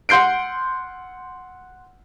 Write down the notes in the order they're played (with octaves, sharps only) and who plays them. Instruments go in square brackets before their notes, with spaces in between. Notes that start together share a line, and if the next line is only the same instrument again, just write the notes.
[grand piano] F#5 C6 G6 C7 D7